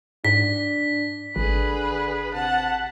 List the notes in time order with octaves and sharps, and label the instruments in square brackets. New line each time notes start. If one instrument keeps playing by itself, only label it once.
[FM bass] G#2 [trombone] D4 [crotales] B6
[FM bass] G#1 [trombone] D3 [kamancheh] G#4 B4
[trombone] C3 [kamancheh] F#5 A5